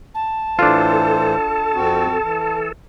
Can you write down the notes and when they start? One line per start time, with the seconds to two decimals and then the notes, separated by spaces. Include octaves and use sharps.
0.15 A5
0.59 A2 E3 D4 F4 A4 C5
1.75 F2 C4 F#4
2.23 E3